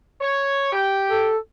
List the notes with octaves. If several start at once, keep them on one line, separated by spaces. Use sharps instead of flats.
C#5
G4 G5
A4